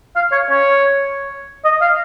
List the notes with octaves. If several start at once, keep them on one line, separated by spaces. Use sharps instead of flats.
F5
C#5
C#5
D#5
F5